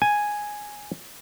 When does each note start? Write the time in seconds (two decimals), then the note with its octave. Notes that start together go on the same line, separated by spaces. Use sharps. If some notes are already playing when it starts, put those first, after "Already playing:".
0.02 G#5